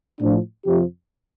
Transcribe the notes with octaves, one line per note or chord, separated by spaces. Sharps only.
A2 F3 D4
F2 C3 F3 G4